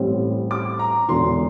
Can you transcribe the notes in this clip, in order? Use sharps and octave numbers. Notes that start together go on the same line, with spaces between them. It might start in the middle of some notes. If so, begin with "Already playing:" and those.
Already playing: A1 A2 G3 C4
D6
A#5
E1 E2 D3 C6